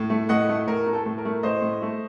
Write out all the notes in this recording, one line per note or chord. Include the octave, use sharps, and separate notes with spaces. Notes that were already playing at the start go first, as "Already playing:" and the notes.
Already playing: A2
A3
A2 D#5 F#5
A3
A2 A#4
A3
A4
A2
A#4
A3
A2 C5 D#5
A2
A3